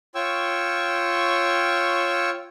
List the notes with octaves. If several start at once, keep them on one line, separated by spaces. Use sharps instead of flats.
F4 C#5 G5 C#6 E6